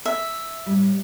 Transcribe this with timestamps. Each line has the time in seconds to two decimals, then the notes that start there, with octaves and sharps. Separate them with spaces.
0.05 E5
0.66 A2 G3